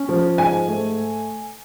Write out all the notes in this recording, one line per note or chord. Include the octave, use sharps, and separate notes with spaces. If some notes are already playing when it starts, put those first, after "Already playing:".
Already playing: C#4
F3
G#2 G#5
A3